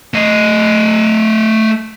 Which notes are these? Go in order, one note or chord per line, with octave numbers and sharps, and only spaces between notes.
A3 D#5